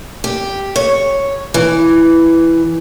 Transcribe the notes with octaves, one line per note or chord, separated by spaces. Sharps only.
G4
C#5
E3